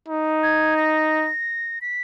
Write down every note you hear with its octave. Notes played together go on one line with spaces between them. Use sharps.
D#4
G#6
A#6
B6